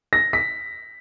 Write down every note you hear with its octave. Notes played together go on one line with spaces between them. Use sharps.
A#6
B6